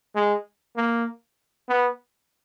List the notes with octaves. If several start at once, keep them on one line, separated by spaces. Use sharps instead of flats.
G#3
A#3
B3